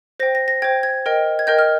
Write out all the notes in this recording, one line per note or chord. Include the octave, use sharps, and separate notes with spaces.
C5 G5 A#6
A#6
A#6
C5 G5 G#6
G#6
A#4 D#5 G5
G#6
A#4 D#5 G5 G6
F6